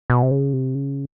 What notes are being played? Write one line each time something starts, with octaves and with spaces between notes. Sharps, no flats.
B2
C3
C#3
C3
C#3